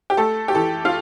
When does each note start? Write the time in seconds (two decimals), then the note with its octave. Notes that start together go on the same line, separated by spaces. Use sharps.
0.10 G4
0.17 A3 A4
0.48 G4
0.55 E3 A4
0.85 F4